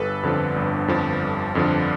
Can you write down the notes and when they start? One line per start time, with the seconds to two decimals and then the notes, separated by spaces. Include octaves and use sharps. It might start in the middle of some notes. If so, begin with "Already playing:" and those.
Already playing: G1 A4 B4
0.23 F2 D3 F3
0.56 G1
0.88 F2 D3 F3
1.22 G1
1.55 F2 D3 F3